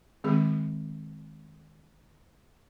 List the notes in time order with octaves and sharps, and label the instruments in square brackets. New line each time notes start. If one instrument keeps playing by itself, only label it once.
[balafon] D#3 G#3 C4 G#4